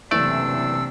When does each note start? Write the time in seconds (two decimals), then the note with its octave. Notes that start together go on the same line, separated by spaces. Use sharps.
0.11 F#1 C3 E3 A3 D4 D5 E5 E6